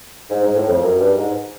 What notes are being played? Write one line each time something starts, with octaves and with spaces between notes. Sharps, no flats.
G#2
G#2
A2
F2
F#2
G2
G#2